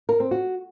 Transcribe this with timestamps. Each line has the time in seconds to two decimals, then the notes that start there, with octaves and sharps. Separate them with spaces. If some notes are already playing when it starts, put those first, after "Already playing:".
0.09 A#4
0.20 C4
0.31 F#4